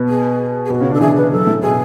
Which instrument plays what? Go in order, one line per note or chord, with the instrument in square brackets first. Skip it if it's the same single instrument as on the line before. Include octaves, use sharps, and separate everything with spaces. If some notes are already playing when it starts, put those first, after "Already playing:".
Already playing: [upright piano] B2 B3
[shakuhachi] G#4
G#4
[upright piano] B2 B3 [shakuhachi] F#4
[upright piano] C#3 C#4
D3 D4
[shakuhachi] A4
[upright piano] E3 E4 [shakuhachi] G#4
[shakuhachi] B4
[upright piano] F#3 [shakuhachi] A4
[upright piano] A2 A3
[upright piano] B2 B3 [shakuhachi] G#4